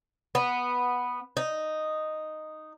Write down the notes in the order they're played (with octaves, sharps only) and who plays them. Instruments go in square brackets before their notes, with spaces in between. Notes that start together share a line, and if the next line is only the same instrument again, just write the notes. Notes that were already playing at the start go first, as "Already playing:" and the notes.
[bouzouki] B3
D#4